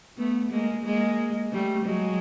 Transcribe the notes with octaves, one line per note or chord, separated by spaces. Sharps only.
A3 B3
G#3 A#3
G#3 A#3
G3 A3
F#3 G#3